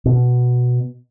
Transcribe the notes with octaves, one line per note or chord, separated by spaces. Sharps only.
B2